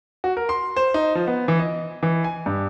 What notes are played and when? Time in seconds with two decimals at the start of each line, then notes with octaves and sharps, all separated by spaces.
0.24 F#4
0.37 A#4
0.49 C6
0.76 C5
0.94 D#4
1.15 F3
1.27 B3
1.48 E3
1.60 D#5
2.03 E3
2.24 G#5
2.46 G2